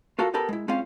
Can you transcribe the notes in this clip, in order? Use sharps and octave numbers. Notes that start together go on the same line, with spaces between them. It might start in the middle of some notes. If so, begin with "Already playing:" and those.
F4 F#4 A4 A#4 F5
B3 G4 A4 A#4 B5
G#3 E4
G#3 C4 C#4 F4 F5